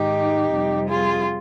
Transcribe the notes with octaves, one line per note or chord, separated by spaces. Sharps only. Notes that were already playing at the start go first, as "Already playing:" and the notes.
Already playing: G#2 D#3 G#3 D#4 G4
F2 C3 G3
F4 G#4